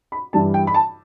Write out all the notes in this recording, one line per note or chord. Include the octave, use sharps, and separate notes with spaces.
B5
G2 E3 G3 A5
G5
B5
A5